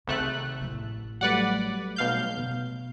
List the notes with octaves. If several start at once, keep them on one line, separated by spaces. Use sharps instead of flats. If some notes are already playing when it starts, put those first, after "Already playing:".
G#1 C3 D#3 A3 F#6
A1 B3
F#3 G3 A3 B4 D5 F#5
B1 F5 G6
B2